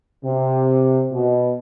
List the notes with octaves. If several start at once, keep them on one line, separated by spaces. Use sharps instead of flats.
C3
B2